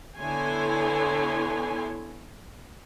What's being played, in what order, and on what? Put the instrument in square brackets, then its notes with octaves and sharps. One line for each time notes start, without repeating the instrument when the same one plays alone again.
[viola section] D3 B3 E4 C#5 G#5 C6